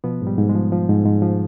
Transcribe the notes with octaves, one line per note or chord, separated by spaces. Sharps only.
B2 F3 B3
G#2
G3
G#2
G#3
F3
F3
G#2
G#2
F3